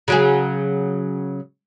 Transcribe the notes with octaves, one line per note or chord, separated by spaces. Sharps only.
C#3 F#3 G#4